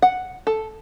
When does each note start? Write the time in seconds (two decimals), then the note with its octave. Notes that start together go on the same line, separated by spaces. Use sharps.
0.02 F#5
0.47 A4